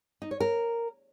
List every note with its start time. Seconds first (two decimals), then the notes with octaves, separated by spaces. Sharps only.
0.22 D#4
0.31 C#5
0.40 A#4